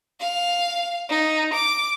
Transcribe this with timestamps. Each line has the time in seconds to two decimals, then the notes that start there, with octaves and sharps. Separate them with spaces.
0.20 F5
1.09 D#4
1.53 D6